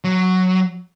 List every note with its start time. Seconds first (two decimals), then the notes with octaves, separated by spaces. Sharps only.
0.04 F#3